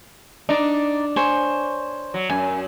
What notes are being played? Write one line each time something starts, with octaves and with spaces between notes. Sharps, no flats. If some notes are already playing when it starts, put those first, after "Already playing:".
D4 D#4 D5
C5 C#5 G#5
F#3
F#2 G#5